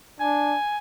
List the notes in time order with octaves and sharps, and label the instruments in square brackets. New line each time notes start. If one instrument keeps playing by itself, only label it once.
[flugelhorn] D4 [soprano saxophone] G#5